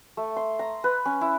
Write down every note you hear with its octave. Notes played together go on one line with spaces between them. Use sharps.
A3
C6
A#5
B4
C#4
E4